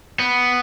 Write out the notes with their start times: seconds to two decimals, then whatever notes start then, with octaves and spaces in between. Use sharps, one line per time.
0.19 B3